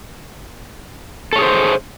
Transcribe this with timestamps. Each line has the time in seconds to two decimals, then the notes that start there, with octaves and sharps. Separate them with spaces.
1.33 A4
1.36 C#5
1.39 G#4
1.42 C5